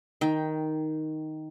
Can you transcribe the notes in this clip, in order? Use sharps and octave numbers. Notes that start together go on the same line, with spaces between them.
D#3 G5